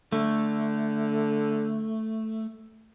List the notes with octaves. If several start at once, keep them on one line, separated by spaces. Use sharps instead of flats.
D3 A3